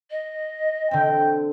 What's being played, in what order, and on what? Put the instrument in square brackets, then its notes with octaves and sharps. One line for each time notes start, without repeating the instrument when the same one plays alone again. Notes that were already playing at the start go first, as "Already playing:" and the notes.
[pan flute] D#5
[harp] D3 C4 [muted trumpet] G5